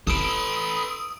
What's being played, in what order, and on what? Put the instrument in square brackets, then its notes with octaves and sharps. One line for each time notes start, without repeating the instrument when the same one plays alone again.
[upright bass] E4 [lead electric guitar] A4 B4 [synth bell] D#6 E6 D7